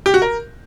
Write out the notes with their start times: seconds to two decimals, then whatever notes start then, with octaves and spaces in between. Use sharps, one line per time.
0.06 G4
0.14 F#4
0.22 A#4